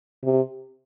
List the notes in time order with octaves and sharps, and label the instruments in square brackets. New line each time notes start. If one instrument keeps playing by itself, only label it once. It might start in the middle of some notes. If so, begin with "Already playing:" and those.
[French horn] C3